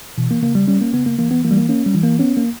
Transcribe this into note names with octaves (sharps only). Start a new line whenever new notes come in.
B2 E3
A#3
C#3 A#3
G3
G3 C#4
A#3
C#3 B3
A#3
E3 A#3
B3
E3 A#3
G3
A#3
A#3 C#4
G3
E3
A#3
B3 C#4
A#3